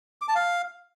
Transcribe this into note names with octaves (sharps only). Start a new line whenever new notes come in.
D6
A5
F5